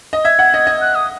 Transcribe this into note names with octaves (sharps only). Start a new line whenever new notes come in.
D#5
E5 G#6
F#5
D#5
D#5
F#6
D#6